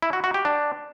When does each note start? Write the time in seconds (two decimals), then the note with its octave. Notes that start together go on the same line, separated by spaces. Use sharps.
0.02 E4
0.13 F#4
0.24 F#4
0.34 G4
0.45 D4